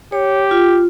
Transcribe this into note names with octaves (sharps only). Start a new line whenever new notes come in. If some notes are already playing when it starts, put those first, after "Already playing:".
G4 C#5
F4